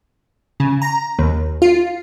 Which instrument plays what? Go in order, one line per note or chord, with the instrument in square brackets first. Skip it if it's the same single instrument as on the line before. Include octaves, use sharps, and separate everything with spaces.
[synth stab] C#3
A#5
D#2
F4